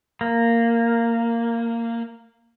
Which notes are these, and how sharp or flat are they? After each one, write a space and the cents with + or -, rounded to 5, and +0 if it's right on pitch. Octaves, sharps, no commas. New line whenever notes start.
A#3 -10